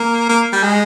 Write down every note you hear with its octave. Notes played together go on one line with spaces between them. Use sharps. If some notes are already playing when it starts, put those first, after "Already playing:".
Already playing: A#3
A#3
G3
G#3